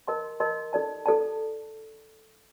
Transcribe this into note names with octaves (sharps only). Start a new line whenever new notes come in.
A#4 D#5 A5 C6
A#4 D#5 A5 C6
D#4 A4 D5 A5
D#4 A4 D5 A5